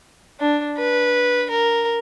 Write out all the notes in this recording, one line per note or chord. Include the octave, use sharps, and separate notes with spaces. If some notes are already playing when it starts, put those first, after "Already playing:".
D4
B4
A#4